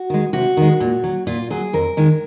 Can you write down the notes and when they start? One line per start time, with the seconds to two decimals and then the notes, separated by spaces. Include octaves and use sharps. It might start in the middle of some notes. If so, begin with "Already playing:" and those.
Already playing: F#4
0.10 D#3 G#3
0.33 C3 F#4
0.57 D#3
0.62 G#3
0.80 A#2
1.04 F#3
1.27 A#2 F4
1.50 F#3 G#4
1.73 F2 A#4
1.97 D#3 G#3